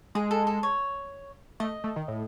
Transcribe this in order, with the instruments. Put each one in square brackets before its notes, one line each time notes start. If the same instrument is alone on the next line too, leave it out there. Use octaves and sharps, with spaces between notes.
[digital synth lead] G#3 [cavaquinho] G#4
[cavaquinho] A4
A4
C#5
[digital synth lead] A3 [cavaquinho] D#5
[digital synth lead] A3
D#3
A2